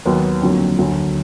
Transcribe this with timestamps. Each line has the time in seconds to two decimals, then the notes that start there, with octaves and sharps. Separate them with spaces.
0.06 D#2 D#3 F#3 B3
0.42 F2 D3 F#3 A#3
0.78 D2 D3 F#3